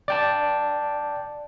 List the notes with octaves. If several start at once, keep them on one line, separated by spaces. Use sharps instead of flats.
D5 G5 A5